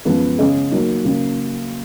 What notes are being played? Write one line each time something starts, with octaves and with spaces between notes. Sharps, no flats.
F#2 F3 G#3 B3
C#3 G#3 C#4 G#4 D#5
F#3 A#3 D#4
C#3 F#3 A#3